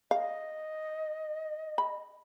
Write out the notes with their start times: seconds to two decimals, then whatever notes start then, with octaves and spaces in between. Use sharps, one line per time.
0.11 D#5 F5
1.78 B5